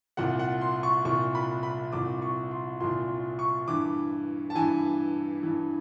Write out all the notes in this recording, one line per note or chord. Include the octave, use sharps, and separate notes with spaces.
C2 A#2 F#5
F#5
C6
C#6
C2 A#2 C#6
B5
B5
C2 A#2 D6
C#6
C6
C2 A#2 C6
C#6
G2 E3 D6
A5
G2 E3 G#5
G2 E3